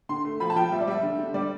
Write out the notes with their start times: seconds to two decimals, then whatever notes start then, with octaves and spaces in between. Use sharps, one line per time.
0.09 D3 C6
0.25 A3
0.40 F3 B5
0.50 A5
0.56 F3 G5
0.71 G3 E5
0.81 D5
0.88 G3 E5
1.03 D3
1.19 D3
1.34 G3 D5